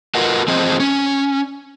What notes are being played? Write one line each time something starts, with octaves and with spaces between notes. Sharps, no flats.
F4 F#4 A#4 B4 D#5 F#5
F3 C4 F4 G#4 C5 D#5
C#4